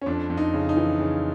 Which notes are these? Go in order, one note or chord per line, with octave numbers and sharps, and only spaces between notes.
C#4
F2 D4
F2
D#4
C#3
D#4
E3
C#3